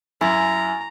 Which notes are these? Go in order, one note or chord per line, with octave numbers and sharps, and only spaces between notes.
F#2 E4 G#5 A#5 A6